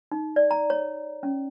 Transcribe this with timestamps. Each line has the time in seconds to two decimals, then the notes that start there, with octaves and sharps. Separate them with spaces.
0.12 D#4
0.36 D5
0.51 A#5
0.70 C#5
1.23 C#4